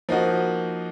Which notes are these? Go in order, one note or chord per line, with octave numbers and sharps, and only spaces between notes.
F3 A#3 D#4 F#4